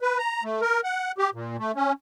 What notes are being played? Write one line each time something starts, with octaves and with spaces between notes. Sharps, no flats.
B4
A#5
A3
A#4
F#5
G4
A#2
A3
C#4